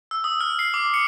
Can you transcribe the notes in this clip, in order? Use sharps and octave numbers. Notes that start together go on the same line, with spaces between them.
E6
D#6
F6
C7
D6
C#7